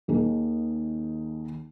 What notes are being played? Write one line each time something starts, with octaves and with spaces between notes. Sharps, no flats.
D#2 D#3 A#3 D#4 G#4